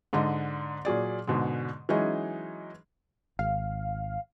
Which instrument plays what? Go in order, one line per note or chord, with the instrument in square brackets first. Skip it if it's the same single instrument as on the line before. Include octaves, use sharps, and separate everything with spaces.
[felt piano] G#2 D3 D#5
A#2 F#3 G#4 D5
G#2 B2 D3 G#3
E3 F#3 G#3 C#4 D#4 G#4
[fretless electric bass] G#1 [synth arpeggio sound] F5